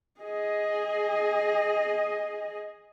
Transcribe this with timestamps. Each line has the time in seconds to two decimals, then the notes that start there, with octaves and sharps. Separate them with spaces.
0.21 G#4 D#5